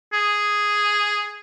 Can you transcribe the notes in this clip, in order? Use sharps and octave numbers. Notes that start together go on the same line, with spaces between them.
G#4